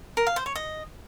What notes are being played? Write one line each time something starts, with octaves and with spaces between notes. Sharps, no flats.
A#4
F5
C5
C#5
D#5